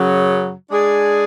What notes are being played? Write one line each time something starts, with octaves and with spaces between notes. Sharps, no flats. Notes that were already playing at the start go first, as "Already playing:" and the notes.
Already playing: F#2 C#3 F#3
G#3 D4 G#4 D5